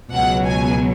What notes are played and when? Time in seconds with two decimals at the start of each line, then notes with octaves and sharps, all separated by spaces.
0.10 C#2 B2 F#3 F#5
0.47 G#5